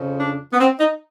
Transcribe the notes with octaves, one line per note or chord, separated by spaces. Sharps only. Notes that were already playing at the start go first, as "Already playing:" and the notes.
Already playing: F2 C#3 F3
D4
B3
C4
D#4